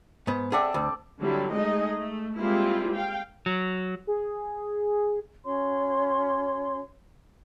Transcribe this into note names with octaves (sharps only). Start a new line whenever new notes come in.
G#2 B3
C4 G#4 A4 D5 E5 F#5
D2
D3 F#3 G3 C4 E4
G#3 A3 D#4 G#4 D#5
A3
G3 G#3 A#3 C4 E4 F4
F5 G5
F#3
G#4
C#4 F#4 C#5 C6